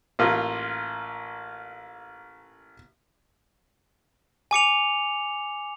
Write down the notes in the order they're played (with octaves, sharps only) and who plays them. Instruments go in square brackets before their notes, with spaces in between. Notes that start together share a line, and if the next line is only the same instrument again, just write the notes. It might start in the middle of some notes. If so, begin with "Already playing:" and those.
[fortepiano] A1 A#3 F4
[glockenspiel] G#5 D6 C#7 F7